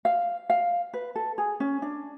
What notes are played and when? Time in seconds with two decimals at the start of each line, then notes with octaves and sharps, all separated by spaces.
0.05 F5
0.50 F5
0.94 B4
1.15 A4
1.38 G#4
1.60 C#4
1.82 D4